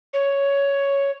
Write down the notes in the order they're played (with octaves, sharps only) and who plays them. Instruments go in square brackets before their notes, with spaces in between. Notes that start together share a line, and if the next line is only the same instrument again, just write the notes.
[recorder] C#5